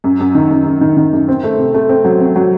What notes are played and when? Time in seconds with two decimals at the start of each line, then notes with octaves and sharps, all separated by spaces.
0.04 F#2
0.20 F#2
0.35 D#3
0.51 F#2
0.66 F#2
0.81 D#3
0.97 D#3
1.13 F#2
1.28 C4
1.44 A3
1.58 C3
1.74 A3
1.89 C4
2.05 F#3
2.20 C4
2.36 F#3